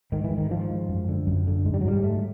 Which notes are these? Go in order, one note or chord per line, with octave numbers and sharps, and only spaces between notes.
G#2 D#3
E3
G#2
D#3
G#2 F3
G#2
F#2
D3
F#2
D3
G#2 G#3
G3
F#3
G#2 G3
G#3
G#2 A3